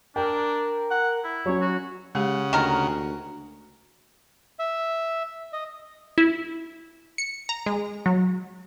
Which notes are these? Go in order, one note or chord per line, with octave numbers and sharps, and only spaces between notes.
D4 A#4 G5
F#5
E4
F#3 C#4 C#5
F#4
C#3 G#3 G4 F#5
D2 D#3 A#4
E5
D#5
E4
C#7
A#5
G#3
F#3